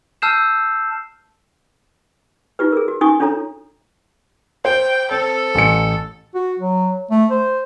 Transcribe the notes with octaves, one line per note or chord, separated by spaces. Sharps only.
A5 E6 F6 G6 C7 E7
D#4 F4 G4 B4
G#4 A#4
F#4
C#4 D#4 F#4 G#5 C#6 D#6
C#4 D4 F4 A4 C#5 A#5
C5 G5
C4 A4
A1 C#7
F#4
F#3
A3
C5